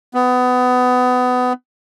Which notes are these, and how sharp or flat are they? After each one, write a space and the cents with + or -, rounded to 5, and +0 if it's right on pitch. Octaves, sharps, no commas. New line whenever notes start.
B3 +25